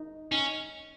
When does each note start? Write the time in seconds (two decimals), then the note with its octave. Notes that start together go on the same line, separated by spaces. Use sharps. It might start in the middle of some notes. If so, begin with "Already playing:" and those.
Already playing: D#4
0.32 C#4 D#4